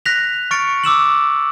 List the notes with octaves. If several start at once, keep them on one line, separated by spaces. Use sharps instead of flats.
F#6 A#6 B6 F7
C#6 F6 A6 C#7 D7
D6 E6 E7 F#7